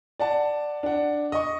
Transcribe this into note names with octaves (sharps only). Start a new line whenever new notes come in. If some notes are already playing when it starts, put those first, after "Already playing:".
D5 F#5 A5
D4 F#5
D#5 C#6